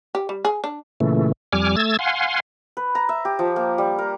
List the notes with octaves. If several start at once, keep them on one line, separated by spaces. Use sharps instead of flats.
G4
G3
G#4
D4
A#2 C#3 E3 A3
F2 G3 G#5 D6 F6
A3 E6 G#6 A6
F5 F#5 G#5 C6
B4
A#5
E5
G4
F3
A#3
G3
A#4